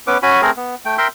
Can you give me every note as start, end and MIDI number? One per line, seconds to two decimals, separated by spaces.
0.07 0.18 59
0.07 0.18 61
0.07 0.18 71
0.07 0.18 86
0.23 0.41 61
0.23 0.41 66
0.23 0.41 80
0.23 0.41 83
0.42 0.51 57
0.42 0.51 60
0.42 0.51 68
0.42 0.51 70
0.57 0.75 59
0.85 0.97 57
0.85 0.97 79
0.98 1.08 70
0.98 1.08 76
0.98 1.08 79
0.98 1.08 84